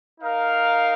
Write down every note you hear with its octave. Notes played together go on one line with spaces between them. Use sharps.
D#4 A#4 F5